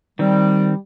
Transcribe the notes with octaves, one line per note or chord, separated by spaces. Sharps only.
D#3 G3 C4